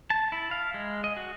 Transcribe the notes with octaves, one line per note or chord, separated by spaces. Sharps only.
A5
E4
F5
G#3
D#5
F#4